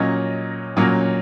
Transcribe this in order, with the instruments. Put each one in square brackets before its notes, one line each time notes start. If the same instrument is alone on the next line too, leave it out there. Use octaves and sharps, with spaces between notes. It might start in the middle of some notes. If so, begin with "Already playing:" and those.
Already playing: [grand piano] A#2 F#3 A#3 C#4 D#5
A#2 F#3 A#3 C#4